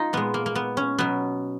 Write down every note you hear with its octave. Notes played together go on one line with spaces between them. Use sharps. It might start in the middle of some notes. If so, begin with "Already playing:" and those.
Already playing: D#4 F4
A#2 G#3 B3
A#3
A#3
B3
C#4
B2 F#3 B3